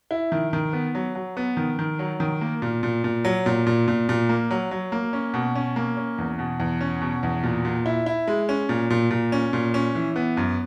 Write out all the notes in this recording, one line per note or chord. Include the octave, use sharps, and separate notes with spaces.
E4
D#3
D#3
B3
F#3
F#3
B3
D#3
D#3
F#3
D#3
A#3
A#2
A#2
A#2
F#3
A#2
A#2
A#2
A#2
A#3
F#3
F#3
A#3
C#4
B2
C#4
A#3
C#4
E2
B2
E2
C#4
B2
E2
A#2
A#2
E4
E4
G#3
C#4
A#2
A#2
A#2
C#4
A#2
C#4
E3
B3
F#2